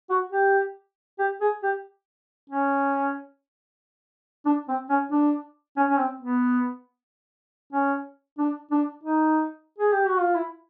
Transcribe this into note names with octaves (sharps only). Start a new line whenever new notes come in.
F#4
G4
G4
G#4
G4
C#4
D4
C4
C#4
D4
C#4
C#4
C4
B3
C#4
D4
D4
D#4
G#4
G4
F#4
F4
E4